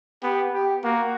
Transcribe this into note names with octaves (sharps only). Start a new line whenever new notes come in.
B3 G4
G4
A#3 F#4